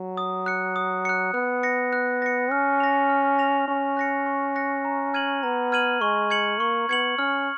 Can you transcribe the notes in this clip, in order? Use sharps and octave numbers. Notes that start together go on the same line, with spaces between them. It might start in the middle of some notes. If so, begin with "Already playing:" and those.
Already playing: F#3
D#6
F#6 C#7
D#6
F#6 C#7
B3 F#6
A#6 C#7
F#6
A#6 C#7
C#4 F6
A#6 F7
F6
A#6 F7
C#4 C#6
F#6 A#6 C#7
C#6
F#6 A#6 C#7
A#5
F6 G#6 D#7 F#7
B3 A#5
F6 G#6 D#7 F#7
G#3 C#6
G#6 C#7 F#7
A#3 C#6
B3 G#6 C#7 F#7
C#4 F6